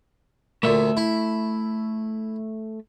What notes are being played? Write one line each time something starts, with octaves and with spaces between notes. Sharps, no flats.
D2 A#2 A3 E5
E4